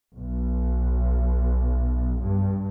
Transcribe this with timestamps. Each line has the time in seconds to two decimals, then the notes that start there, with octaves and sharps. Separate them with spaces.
0.17 B1
2.21 G2